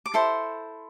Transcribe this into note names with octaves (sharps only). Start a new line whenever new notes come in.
D6
E4 A4 C5 C6